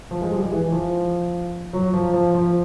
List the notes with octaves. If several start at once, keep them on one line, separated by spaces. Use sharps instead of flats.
F3
G#3
G3
G#3
E3
F3
F#3
F3
F3
F3